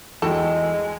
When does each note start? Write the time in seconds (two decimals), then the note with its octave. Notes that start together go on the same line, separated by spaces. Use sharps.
0.22 E2 G#3 E4 F#4 A4 G5